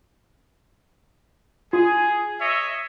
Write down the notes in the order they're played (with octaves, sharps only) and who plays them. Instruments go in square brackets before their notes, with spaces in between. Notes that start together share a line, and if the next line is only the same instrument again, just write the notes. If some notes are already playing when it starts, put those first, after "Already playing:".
[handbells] F4 [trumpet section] G#4
[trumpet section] C#5 D#5 E5